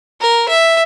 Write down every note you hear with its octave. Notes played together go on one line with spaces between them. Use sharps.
A#4
E5